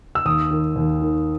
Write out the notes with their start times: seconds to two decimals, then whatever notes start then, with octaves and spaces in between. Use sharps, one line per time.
0.15 E6
0.25 D#2 D#6
0.51 D#3
0.76 D#2
1.02 D#3